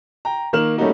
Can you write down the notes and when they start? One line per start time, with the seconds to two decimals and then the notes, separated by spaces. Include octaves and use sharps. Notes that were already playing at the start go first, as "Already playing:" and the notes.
0.25 G5 A#5
0.53 D#3 A#3 F6 E7 F#7
0.78 G3 A3 A#3 C#4 D#4 F#4